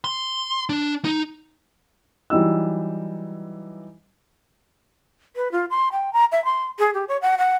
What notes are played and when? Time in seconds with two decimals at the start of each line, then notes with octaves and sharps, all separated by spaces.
0.04 C6
0.69 D4
1.05 D#4
2.30 E3 F#3 G3 D#4 E6
5.36 B4
5.52 F4
5.70 C6
5.92 G5
6.13 A#5
6.32 E5
6.45 C6
6.79 G#4
6.94 G4
7.08 C#5
7.22 F#5
7.38 F#5